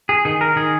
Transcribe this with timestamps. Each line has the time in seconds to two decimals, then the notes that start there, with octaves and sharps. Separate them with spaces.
0.09 G#4
0.25 D#3 G#4
0.41 A#4
0.56 D#3 G#4